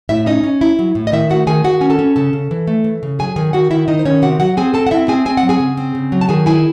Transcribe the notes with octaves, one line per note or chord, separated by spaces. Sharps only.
A2 E4 E5
C#4 D#4 D#5
C#4
E4
F#3
A2
D#5
D#3 E4 E5
A3 F#4 F#5
D#3 G#4 G#5
D#3 F#4 F#5
C#4 G#5
A4 A5
C#4
C#3 A4 A5
C#3
E3
A3
E3
C#3
F#3 G#4 G#5
D#3 G#4 G#5
D#3 F#4 F#5
D#3 E4 E5
D#3 D#4 D#5
C5
D#3 C#4 C#5
C3 F#4 F#5
F#3 F#4 F#5
C4 G#4 G#5
C4 A4 A5
F#5
C4 E4 E5
C4 G#4 G#5
C4 G#5
F#5
F#3
G#4 G#5
C#3
C4
C#3
F#3
A5
D#3 G#4 G#5
E4 G#4 G#5